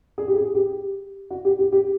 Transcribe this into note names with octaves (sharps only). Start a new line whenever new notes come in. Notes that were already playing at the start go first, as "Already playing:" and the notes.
G#4
G4
G#4
G4
F#4
G4
G4
G4